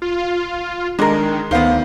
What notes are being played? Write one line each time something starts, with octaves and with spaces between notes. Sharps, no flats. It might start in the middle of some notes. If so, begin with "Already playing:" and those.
F4
D#3 G#3 D4 A#4
D2 D#3 B3 C5 F5